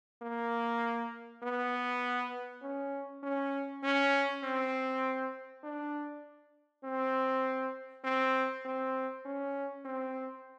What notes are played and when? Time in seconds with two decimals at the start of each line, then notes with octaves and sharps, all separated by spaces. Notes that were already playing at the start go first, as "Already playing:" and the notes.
0.22 A#3
1.43 B3
2.62 C#4
3.23 C#4
3.84 C#4
4.43 C4
5.64 D4
6.84 C4
8.04 C4
8.65 C4
9.25 C#4
9.85 C4